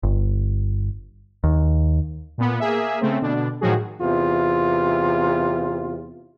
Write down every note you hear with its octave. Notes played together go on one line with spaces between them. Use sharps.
G1
D#2
A#2 B3
A#3 G#4 E5
C#3 A3 C4
B2 D3 D4
A2 D#3 F3 F#3 F#4 G#4
E2 C3 F4